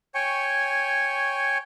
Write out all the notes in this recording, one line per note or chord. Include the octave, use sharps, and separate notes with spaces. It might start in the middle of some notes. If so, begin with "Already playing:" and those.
C#5 G5 G#5 C#6